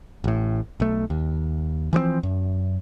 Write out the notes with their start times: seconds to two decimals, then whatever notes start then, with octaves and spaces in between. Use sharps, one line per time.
0.24 A1 A2
0.80 B1 A3
1.10 D#2
1.93 E3 F3 A3 C4
2.23 F#2